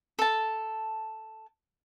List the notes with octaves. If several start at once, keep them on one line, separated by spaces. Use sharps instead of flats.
A4 A5